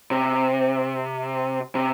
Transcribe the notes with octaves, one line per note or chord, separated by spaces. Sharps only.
C3
C3